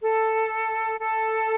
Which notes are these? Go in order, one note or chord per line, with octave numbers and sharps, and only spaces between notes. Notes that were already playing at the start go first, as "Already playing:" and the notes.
A4
A4